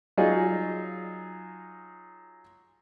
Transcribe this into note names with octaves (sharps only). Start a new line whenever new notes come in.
F#3 D#4 F4 G#4